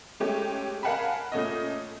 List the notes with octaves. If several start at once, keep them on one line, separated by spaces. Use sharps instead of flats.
G#3 A3 C#4 G4
A#4 F5 F#5 G#5 A5 B5
A#2 A3 C#4 D#5